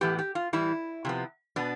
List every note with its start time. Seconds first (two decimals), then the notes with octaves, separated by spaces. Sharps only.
0.01 A2 E3 B3 G4
0.19 G4
0.35 F4
0.53 A2 E3 G3 E4
1.05 C3 F3 B3
1.56 B2 B3 D4